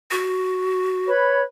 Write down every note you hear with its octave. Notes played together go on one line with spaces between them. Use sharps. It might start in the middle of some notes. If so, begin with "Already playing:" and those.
F#4
B4 C#5 B5